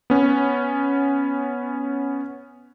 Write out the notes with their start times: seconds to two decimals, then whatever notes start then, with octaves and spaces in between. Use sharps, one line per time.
0.10 B3 C#4